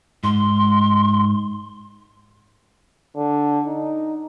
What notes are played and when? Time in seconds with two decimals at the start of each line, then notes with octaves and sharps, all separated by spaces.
0.24 G#2 C6
3.16 D3
3.66 D#4